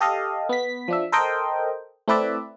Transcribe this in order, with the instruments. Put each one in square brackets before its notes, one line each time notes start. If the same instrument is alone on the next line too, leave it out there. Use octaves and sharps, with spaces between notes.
[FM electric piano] G4 A4 D#5 F5
B3 B6
F3 D4 E5
A4 A#4 C5 D#5 G5
A3 C4 E4 B4 D5 E5